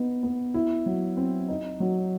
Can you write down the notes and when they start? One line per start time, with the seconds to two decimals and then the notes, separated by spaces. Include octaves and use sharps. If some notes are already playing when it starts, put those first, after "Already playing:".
Already playing: B3 D#4
0.23 B3
0.54 E4
0.86 F#3
1.17 C4
1.49 D#4
1.80 F#3